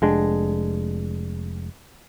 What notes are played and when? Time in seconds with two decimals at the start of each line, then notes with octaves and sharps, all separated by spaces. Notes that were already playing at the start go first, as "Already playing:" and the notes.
0.02 F1 G#3 D4